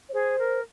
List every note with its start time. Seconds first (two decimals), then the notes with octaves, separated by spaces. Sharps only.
0.09 C#5
0.13 G#4 C5
0.39 A#4